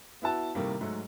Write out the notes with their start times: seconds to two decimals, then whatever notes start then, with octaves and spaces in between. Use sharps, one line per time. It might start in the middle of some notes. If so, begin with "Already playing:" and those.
0.22 B3 E4 F#4 A5
0.55 A2 C3 D#3 G3 A3 A#3
0.81 G#2 F#3 A3